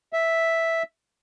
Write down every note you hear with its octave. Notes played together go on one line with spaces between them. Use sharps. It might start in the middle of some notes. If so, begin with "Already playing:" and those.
E5